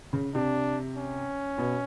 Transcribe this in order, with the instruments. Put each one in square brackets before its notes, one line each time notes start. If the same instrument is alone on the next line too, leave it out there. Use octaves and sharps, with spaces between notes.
[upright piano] C#3
[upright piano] C3 [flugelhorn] D4
[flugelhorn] C#4
[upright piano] B2